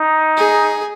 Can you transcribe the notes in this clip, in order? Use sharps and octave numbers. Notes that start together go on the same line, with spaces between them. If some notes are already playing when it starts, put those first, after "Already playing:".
Already playing: D#4
G#4